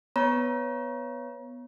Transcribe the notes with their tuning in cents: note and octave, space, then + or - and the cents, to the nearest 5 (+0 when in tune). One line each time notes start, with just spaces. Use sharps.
B3 +0 C#5 +0 A#5 +35